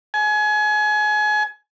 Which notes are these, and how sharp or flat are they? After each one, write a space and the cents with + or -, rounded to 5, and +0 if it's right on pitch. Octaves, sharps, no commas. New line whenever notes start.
G#5 +30